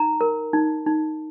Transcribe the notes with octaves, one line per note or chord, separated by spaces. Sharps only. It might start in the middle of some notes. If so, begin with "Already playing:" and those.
Already playing: D#4 A#5
A#4
D#4
D#4